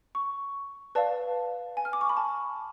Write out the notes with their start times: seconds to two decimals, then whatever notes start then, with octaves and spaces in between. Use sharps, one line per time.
0.15 C#6
0.95 B4 D5 F5 A5
1.77 G#5
1.85 F6
1.93 D6
2.01 C#6
2.09 B5
2.17 A5